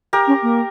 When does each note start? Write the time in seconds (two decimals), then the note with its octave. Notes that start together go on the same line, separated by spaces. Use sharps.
0.13 G4 A#4
0.27 C#4
0.43 A#3